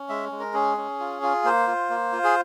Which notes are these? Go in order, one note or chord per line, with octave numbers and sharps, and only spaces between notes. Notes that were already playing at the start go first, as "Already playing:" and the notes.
Already playing: C#4
G#3 E5
G#3
A#4
C#4 G#4
C#4
F4
F4
A#3 C5
F4
A#3
F4
G#4